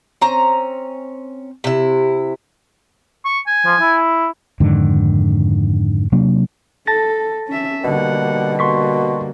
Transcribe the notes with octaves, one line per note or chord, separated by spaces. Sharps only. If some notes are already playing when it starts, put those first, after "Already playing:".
C4 C#4 A#5
C3 E4
C#6
G#5
F3
E4
F2 G#2 D3 D#3
C3 F#3 A#3 D4
A4 A5 A6 A#6
C#4 E5
B2 D3 G3 A#3 F#5
A#3 F#4 C6 C#6 B6